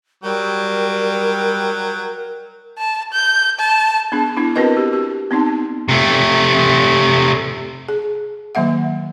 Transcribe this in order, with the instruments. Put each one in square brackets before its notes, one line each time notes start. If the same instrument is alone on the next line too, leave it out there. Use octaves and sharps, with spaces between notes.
[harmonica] F#3 G5 [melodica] G3 [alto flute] A#4
[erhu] A5
G6
A5
[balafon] B3 D4 G#4
B3 D4 E4
C4 F#4 A#4 B4 D#5
G4
G4
B3 C4 D#4
[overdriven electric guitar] C3 A3
[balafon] G#4
D#3 F#3 A#3 E5 F#5